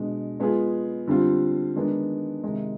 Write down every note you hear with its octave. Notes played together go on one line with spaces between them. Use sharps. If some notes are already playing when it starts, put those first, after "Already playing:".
Already playing: B2 G#3 D4
G#3 B3 F4 G#4
D3 G3 C4 F4
D#3 G#3 B3 D4
C3 D#3 G#3